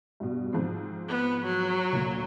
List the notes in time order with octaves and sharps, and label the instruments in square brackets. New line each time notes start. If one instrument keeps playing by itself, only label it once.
[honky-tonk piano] G2 B2
G#2 F3 C4
[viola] B3
F#3
[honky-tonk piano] D2 A#2